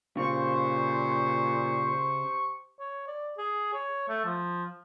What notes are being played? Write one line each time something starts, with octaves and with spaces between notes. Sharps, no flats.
A#2 C#3 G4 C5 C#6
C#5
D5
G#4
C#5
A3
F3